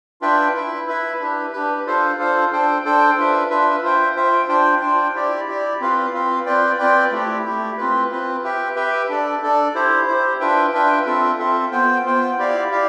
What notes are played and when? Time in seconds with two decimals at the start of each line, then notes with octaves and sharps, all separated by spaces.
0.21 D4 F4 B4 E5 G5
0.54 E4 B4 E5
0.87 E4 B4 E5
1.20 D4 G4 B4
1.53 D4 G4 B4
1.86 D4 F4 A4 C5 F5
2.18 D4 F4 A4 C5 F5
2.52 D4 A4 C5 G5
2.85 D4 A4 C5 G5
3.17 D4 F4 B4 E5
3.50 D4 F4 B4 E5
3.83 F4 C5 E5 G5
4.16 F4 C5 E5 G5
4.49 D4 F4 C5 G5
4.82 D4 F4 C5 G5
5.14 E4 G4 D5
5.47 E4 G4 D5
5.80 C4 F4 B4 F5
6.13 C4 F4 B4 F5
6.46 C4 F4 B4 D5 G5
6.78 C4 F4 B4 D5 G5
7.12 A3 E4 G4
7.45 A3 E4 G4
7.77 C4 F4 B4
8.11 C4 F4 B4
8.43 G4 B4 E5 G5
8.76 G4 B4 E5 G5
9.09 D4 A4 D5
9.42 D4 A4 D5
9.74 E4 G4 C5
10.07 E4 G4 C5
10.40 D4 F4 B4 E5 G5
10.73 D4 F4 B4 E5 G5
11.06 C4 F4 A4 E5
11.39 C4 F4 A4 E5
11.71 B3 F4 C5 G5
12.05 B3 F4 C5 G5
12.38 E4 G4 D5 F5
12.70 E4 G4 D5 F5